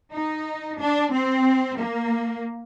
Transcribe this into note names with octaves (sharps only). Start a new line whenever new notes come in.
D#4
D4
C4
A#3